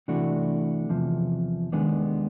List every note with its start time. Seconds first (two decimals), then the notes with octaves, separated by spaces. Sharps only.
0.08 C3 E3 A3 D4 F#4
0.89 E2 C3 F3
1.72 D#2 D#3 G#3 B3 D4